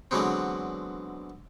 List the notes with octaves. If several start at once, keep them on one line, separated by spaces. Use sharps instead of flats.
D3 E3 F#3 G#3 B3 C4